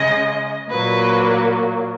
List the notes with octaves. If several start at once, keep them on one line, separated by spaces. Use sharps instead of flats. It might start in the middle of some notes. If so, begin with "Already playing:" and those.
Already playing: C#3 G#3 D#5
A#2 F#3 A#3 B4